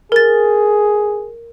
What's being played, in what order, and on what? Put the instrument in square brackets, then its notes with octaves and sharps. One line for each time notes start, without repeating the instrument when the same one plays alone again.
[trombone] G#4 [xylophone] A#4 A6